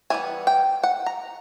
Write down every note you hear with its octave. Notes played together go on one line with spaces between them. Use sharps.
E3 G3 B3 G#5
G5
F#5
A#5